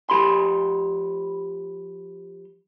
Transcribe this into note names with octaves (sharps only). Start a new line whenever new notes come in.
F3 G4 B5 C6